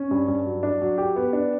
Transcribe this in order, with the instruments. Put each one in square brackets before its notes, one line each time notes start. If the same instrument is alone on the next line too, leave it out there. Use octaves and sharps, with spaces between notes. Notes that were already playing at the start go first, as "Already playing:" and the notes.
Already playing: [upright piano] C#4
G2
G2
F#3
D4
F#3
G4
B3
D4